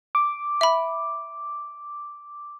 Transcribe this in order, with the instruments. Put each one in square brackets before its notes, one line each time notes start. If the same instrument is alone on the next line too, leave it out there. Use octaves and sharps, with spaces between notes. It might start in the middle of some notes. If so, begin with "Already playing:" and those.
[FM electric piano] D6
[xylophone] E5 B5